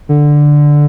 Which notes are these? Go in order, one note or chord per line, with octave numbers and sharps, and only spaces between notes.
D3